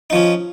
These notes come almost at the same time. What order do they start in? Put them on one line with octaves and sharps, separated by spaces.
D#4 F3 C#4